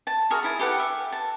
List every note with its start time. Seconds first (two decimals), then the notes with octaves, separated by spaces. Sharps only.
0.07 A5
0.31 F#4 G#4 A#4 E5
0.43 D#4 E4 G#5
0.59 G4 A4 B4 F#5
0.79 E5
1.12 A5